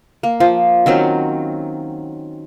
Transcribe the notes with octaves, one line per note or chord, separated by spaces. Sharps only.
A#3
F3
D#3 F#3 C4 C#4